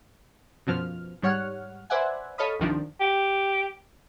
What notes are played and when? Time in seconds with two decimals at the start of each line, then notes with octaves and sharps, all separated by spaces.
0.67 F#2 B2 F3 F6
1.22 G#2 G3 C#5 F#5 F6
1.90 B4 C5 D5 E5 F#5 G#5
2.38 A4 C#5 D#5 F5 B5 D#6
2.59 G1 C2 D#3 F3 D4
3.01 G4